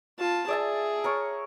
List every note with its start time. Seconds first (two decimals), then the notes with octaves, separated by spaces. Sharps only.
0.19 F4 A5
0.48 G#4 D5 E5 A5
1.04 A#4 C#5 C#6